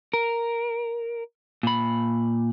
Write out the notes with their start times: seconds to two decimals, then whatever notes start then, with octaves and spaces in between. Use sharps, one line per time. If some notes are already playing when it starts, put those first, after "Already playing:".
0.14 A#4
1.63 A#2 B5